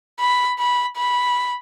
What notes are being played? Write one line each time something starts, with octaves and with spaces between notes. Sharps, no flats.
B5
B5
B5